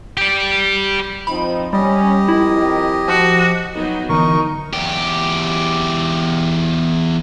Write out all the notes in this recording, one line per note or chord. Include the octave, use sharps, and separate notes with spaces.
G4 D5
F3 C4 D#4 B5
G3 C#4 G4 D#5
F2 D#3 G#3 E4
F3 F#4
F#3 B3 D#4
D3 E3 B3 D#4 A#4 C#6
E2 G4